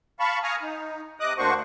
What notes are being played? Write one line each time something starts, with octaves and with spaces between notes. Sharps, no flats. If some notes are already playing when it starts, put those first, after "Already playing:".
F5 A5 B5 C#6
F5 G#5 A#5 C#6 D#6 F6
D#4
C3 D#5 D6 D#6 F#6
D2 A#3 D4 F#4 C5 C#6